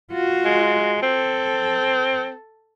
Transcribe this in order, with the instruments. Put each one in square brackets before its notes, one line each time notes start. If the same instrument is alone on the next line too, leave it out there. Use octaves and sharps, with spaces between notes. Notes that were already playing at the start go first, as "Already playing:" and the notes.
[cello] F4 F#4
[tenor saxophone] G#3
[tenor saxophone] C4 [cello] A4